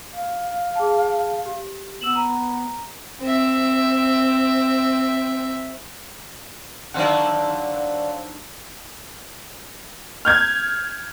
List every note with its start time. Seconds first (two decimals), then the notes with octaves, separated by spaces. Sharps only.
0.14 F5
0.75 G#4 A5
1.46 G4
2.01 B3 E6 E7 F#7
2.16 A#5
3.21 C4 E5
6.94 D3 D#3 F#3 D4 C5 D5 F5 F#5
10.25 F6 G6 G#6